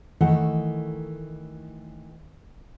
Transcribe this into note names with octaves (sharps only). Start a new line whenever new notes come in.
D#3 E3 A3 F#5